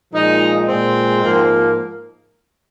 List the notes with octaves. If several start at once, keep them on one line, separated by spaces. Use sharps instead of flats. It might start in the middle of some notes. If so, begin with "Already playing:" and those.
A#2 F3 G#3 D#4
A#2 G#3 C4
G#2 F3 A#3